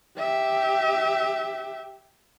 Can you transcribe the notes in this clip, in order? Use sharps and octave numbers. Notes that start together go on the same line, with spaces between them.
G4 E5